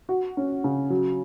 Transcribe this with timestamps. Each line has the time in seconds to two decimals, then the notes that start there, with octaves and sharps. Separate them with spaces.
0.09 F#4
0.37 C#4
0.64 C#3
0.90 F#3